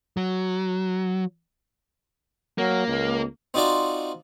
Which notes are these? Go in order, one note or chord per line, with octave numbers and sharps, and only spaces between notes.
F#3
F#3 A#3
C#2
C4 D#4 F4 F#4 D5 A#5